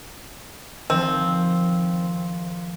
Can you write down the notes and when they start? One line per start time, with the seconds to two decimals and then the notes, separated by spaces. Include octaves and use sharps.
0.90 D#3 F3 C4